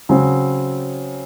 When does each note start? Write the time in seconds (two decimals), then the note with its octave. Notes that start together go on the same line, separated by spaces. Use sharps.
0.09 C#3 F#3 C4